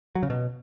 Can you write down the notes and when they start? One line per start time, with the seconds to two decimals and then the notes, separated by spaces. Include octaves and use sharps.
0.15 F#3
0.23 C#3
0.30 B2